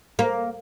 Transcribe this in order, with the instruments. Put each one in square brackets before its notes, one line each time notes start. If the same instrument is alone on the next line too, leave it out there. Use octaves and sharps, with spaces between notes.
[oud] A#3